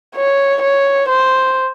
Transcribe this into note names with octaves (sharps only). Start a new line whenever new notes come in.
C#5
C#5
C5